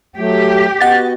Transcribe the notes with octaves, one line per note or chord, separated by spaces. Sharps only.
F#3 A3 G4
B3 F#4 D#5 F#5 A6